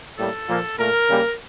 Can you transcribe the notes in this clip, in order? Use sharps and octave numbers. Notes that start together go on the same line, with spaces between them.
A2 G3 A#3 A4
A#2 F3 A#3
A#2 A3 A#4
C#3 G3 A#3